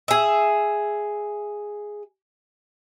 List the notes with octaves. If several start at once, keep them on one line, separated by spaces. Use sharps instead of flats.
G#4 E5